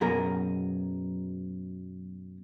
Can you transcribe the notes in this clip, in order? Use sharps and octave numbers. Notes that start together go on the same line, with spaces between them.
F#2 B2 G#4 A#4 A#5